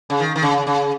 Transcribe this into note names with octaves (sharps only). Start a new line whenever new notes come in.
C#3
D#3
D#3
C#3
C#3